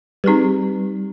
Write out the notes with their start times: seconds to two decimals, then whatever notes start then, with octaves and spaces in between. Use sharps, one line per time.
0.24 G3 C4 D#4 G#4 B4